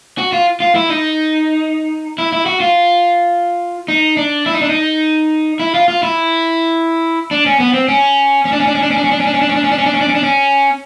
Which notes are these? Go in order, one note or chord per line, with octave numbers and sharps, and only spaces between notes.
F#4
F4
F4
E4
D#4
E4
E4
F#4
F4
D#4
D4
E4
D#4
D4
D#4
E4
F4
F4
E4
D4
C#4
B3
C4
C#4
C#4
D4
C#4
D4
C#4
D4
C#4
D4
C#4
D4
C#4
D4
C#4
D4
C#4
D4
C#4
D4
C#4
D4
C#4
D4
C#4
D4
C#4